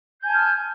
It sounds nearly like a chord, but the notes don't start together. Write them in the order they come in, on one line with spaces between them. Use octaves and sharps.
G6 G#5 A5 F6